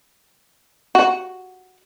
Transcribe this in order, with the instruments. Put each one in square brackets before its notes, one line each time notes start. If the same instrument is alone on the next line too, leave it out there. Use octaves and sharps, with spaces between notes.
[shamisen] F#4